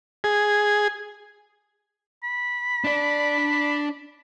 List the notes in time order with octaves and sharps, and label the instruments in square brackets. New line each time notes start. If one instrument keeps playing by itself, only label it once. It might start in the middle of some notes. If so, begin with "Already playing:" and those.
[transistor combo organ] G#4
[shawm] B5
[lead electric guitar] D4 D5